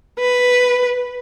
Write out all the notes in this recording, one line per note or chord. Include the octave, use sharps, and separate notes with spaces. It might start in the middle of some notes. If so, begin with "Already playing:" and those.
B4